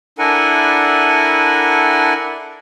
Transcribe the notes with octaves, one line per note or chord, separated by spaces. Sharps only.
D4 E4 A4 A#4 F#5 G#5